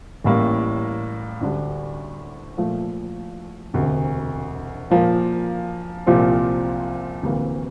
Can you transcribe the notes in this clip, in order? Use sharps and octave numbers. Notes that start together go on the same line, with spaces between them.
A1 A2 G3 A#3
D2 D3 G3 D4
A#2 F3 A3
E1 D2 C3
A#2 F3 A#3
C2 A#2 F3 C4 G4
D2 C3 E3 A#3